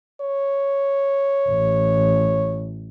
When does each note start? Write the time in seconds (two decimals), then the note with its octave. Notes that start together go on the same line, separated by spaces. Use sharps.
0.21 C#5
1.49 A1